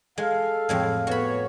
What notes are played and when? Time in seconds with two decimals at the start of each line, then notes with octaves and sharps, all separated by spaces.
0.18 G#3 A4 F5
0.69 F2 A2 G#3
1.07 B3 F#4 C#5 B5